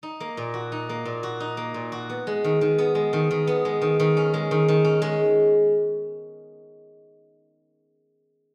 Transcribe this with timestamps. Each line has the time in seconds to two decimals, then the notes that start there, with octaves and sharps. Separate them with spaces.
0.03 D#4
0.20 A#3
0.37 A#2
0.54 F#4
0.72 D#4
0.89 A#3
1.05 A#2
1.23 F#4
1.40 D#4
1.57 A#3
1.74 A#2
1.92 F#4
2.09 B3
2.27 G#3
2.44 D#3
2.61 D#3
2.78 B3
2.95 G#3
3.13 D#3
3.31 D#3
3.47 B3
3.65 G#3
3.82 D#3
4.00 D#3
4.17 C#4
4.34 G#3
4.51 D#3
4.68 D#3
4.84 C#4
5.02 G#3